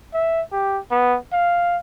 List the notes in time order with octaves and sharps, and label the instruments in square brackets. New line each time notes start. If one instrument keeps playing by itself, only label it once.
[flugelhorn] E5
G4
B3
F5